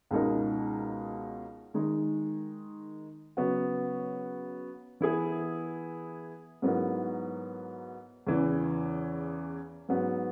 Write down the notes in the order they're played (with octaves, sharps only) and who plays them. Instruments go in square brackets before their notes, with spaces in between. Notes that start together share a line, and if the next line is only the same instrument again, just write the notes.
[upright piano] C#2 B2 G#3 D#4 A#4
D#3 G#3 D#4
C#3 F#3 B3 F#4
E3 B3 E4 G#4
G#2 F#3 B3 E4 A#4
E2 C#3 E3
G#2 F#3 B3